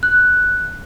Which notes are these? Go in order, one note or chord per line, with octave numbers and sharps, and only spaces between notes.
F#6